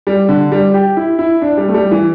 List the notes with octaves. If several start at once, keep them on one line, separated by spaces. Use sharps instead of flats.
G3
D3
G3
G4
E4
E4
D4
G3
A3
G3
E3